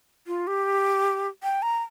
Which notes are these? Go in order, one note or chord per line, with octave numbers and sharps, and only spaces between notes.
F4
G4
G5
A#5